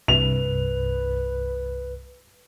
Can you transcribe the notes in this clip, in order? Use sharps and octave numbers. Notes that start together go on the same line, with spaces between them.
C2 G2 B4 F7